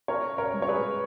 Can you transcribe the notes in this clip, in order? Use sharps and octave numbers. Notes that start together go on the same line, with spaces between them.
C#4 A#4 C#5
A#4 C#5
G#3
C#5
G#4 B4